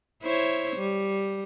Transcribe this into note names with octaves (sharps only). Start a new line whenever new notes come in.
E4 C5 C#5
G3